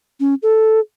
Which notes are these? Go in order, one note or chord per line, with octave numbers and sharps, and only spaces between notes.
C#4
A4